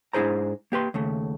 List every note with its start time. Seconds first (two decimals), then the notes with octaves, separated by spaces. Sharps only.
0.13 G#2 D4 E4 G#4 C5 A#5
0.72 A#3 G4 B4 C6
0.94 D#2 C#3 A3